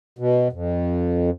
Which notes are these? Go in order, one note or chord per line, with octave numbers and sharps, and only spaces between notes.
B2
F2